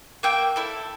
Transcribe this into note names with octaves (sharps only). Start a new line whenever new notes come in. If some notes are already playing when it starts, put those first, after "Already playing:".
A#3 E5 G5
E4 A4